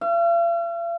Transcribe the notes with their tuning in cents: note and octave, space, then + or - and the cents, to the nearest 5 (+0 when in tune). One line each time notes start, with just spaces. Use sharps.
F5 -45